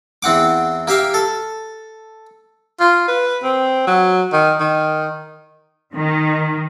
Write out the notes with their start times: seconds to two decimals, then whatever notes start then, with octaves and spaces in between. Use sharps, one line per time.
0.23 E2 C4 F#5 D6
0.87 A#3 G4 E5 F5
1.14 A4
2.80 F4
3.08 B4
3.43 C4
3.87 F#3
4.33 D#3
4.60 D#3
5.94 D#3